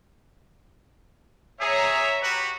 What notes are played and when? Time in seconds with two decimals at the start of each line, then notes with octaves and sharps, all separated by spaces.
1.61 G#4 C#5 E5 A#5
2.22 F#4 G4 B4